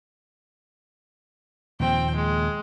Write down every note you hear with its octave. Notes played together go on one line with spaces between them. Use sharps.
D#2 A#2 F3 C4 G5
G#3